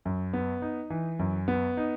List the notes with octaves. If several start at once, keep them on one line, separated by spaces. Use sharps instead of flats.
F#2
B3
D#4
E3
F#2
B3
D#4